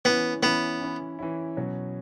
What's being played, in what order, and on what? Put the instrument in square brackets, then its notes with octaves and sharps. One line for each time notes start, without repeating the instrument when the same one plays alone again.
[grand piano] E3 C#4 E4 [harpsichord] B3
[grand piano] E3 C#4 E4 [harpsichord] B3
[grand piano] E3 C#4 E4
E3 C#4 E4
B2 F#3 C#4